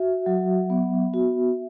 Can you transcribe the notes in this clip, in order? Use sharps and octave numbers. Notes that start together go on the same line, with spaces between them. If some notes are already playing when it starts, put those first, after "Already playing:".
Already playing: F#4 E5
F#3
B3
F#4